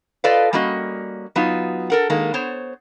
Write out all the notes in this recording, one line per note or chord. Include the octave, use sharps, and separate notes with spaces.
F4 A4 B4 D5 D#5 F5
G3 A#3 C#4 F#4 D#5
F#3 B3 D#4 F4
A4 A#4 F#5
D#3 G#3 A#3
B3 C5 C#5